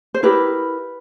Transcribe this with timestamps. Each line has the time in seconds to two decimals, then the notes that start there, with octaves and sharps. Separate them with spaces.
0.14 C5
0.23 E4 G4 A#4 B4